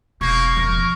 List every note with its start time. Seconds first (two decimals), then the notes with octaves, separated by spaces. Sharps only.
0.21 E1 B2 A#3 D#4 C#6
0.57 F2 A#4